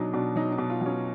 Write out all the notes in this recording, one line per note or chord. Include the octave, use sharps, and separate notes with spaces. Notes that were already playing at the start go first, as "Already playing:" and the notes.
Already playing: B2 F#3 D4 D#4
B2 D4
F#3 D#4
D#4
B2
F4
F#3 C#4